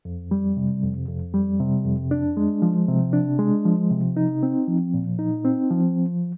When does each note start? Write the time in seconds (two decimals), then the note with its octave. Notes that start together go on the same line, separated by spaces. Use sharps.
0.05 F2
0.31 G3
0.57 C3
0.83 F2
1.09 F2
1.34 G3
1.60 C3
1.85 F2
2.11 D4
2.37 G#3
2.62 F3
2.89 C3
3.13 D4
3.39 G#3
3.65 F3
3.90 C3
4.17 D#4
4.43 C4
4.68 F3
4.94 A#2
5.19 D#4
5.45 C4
5.71 F3